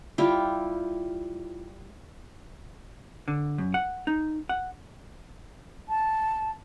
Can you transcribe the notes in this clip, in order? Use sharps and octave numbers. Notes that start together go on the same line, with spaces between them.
G3 E4 F4 G4
D3
F#2
F#5
D#4
F#5
A5